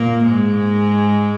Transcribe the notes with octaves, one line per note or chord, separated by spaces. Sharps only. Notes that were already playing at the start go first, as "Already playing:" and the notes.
Already playing: A#2 A#3
G#2 G#3